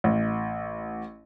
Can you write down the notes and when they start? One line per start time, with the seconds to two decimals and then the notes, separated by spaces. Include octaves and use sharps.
0.04 A1